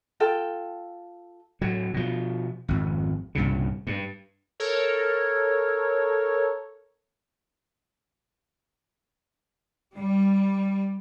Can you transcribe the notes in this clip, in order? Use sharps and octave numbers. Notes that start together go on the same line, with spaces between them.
F4 A4 G5
A2 F#3
B2 F3
G#1 F2
C2 G2 A#2 C#3
G2
A4 A#4 C#5
G3